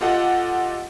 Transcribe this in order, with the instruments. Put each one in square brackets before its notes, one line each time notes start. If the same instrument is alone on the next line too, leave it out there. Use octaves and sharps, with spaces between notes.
[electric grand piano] F4 G4 A4 D#5 F#5